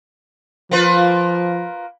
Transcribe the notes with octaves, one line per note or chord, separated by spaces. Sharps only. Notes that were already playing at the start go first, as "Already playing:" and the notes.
F3 A#3 F4 B4